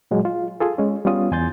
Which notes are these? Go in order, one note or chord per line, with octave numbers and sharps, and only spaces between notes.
A#2 F#3 G#3
F4
F4 G#4 A4
G#3 C#4
G3 B3 C#4 F4 D#6
E2 G#5 C6 G6 A6